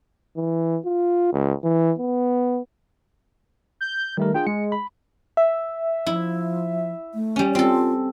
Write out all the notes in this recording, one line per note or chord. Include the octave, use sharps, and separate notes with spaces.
E3
F4
C#2
E3
B3
G6
D#3 G3 A3 A#4
D4 F4 G#4 G5
G#3 C#7
B5
E5
F3 E4
A3
G3 C#4
C4 F4 A4